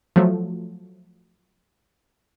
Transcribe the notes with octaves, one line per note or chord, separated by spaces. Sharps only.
F3 F#3 A3